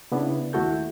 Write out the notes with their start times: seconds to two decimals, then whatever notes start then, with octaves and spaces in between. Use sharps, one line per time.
0.12 C#3 B3 D4 E4
0.53 D#2 A3 E4 F#4 A4 G6